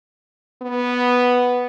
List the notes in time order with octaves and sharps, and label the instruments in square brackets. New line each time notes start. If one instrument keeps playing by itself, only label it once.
[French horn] B3